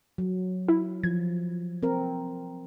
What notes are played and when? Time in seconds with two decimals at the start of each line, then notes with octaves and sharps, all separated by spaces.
0.18 F#3
0.68 E4
1.04 F3 G#6
1.83 C4 A#4